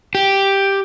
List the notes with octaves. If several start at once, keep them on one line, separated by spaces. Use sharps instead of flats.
G4